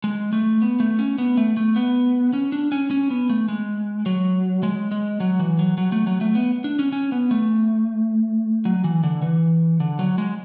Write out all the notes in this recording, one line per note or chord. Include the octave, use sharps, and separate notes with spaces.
G#3
A3
B3
A3
C#4
B3
A3
A3
B3
C#4
D4
C#4
C#4
B3
A3
G#3
F#3
G#3
G#3
F#3
E3
F#3
F#3
A3
F#3
A3
B3
D4
C#4
C#4
B3
A3
F#3
E3
D3
E3
D3
F#3
G#3